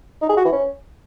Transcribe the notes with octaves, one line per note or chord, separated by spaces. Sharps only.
D#4
G#4
F#4
E3
C#4